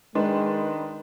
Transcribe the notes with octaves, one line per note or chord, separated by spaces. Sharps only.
D#3 G#3 D4 B4 C6